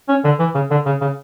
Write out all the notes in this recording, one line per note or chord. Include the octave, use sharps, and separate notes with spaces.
C#4
D3
E3
C#3
D3
C#3
C#3